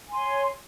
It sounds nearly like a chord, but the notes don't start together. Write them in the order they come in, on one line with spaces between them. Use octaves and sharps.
G#5 C6 C#5